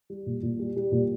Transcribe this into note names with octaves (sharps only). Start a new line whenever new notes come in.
G3
A#2
A#2
G3
G3
A#2